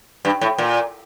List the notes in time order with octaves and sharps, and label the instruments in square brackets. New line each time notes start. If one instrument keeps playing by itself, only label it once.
[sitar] G2
A2
A#2